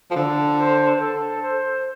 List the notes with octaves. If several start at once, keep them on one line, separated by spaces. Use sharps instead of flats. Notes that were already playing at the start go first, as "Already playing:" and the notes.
F3
D3 A4
C5
C5
A4
C5